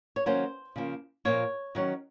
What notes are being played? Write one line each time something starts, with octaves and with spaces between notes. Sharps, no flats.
C#5
D#3 F#3 A#3 C#4 C5
C#3 F3 A#3
A#2 F3 A#3 C#5
D#3 F#3 C#4